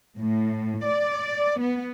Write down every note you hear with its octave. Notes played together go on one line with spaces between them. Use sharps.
A2
D5
B3